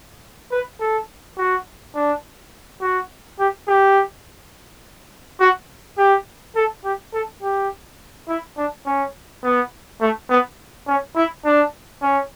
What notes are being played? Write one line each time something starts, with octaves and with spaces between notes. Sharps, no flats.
B4
A4
F#4
D4
F#4
G4
G4
F#4
G4
A4
G4
A4
G4
E4
D4
C#4
B3
A3
B3
C#4
E4
D4
C#4